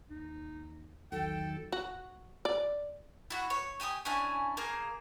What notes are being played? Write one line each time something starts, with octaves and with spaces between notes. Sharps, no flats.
D#2 D#4
B1 E2 D#3 F#3 A4 G5
F#4
D5
E4 F#4
C#5
G4 G#5 B5 D#6
C#4 D4 E4 G#5
A#3 G#4 F5 G6